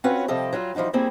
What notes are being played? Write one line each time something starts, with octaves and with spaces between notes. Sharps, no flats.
C4 C#4 F4 F#4 B4 C#5
C3 F3 G3 A4 D#5
F#3 G3 F4
E3 F3 G3 D#4 F#4
G3 A#3 C4 E4 G#4